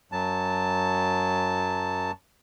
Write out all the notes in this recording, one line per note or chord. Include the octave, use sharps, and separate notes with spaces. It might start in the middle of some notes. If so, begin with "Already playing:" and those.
F#2 F#3 A5